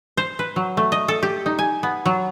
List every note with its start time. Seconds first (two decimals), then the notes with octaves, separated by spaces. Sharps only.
0.17 C5
0.39 B4
0.56 F#3
0.77 A3
0.92 D#5
1.08 A4
1.23 G4
1.46 D#4
1.59 G#5
1.83 B3
2.06 F#3